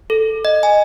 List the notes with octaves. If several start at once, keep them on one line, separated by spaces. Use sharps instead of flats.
A4
D#5
G#5